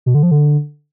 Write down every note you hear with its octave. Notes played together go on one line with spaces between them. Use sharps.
B2
D3
F3
D3